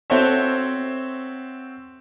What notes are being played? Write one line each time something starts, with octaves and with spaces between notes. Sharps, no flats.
C4 F#4 A4 C5 C#5 E5